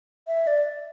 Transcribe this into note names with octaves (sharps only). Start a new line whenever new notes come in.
E5
D5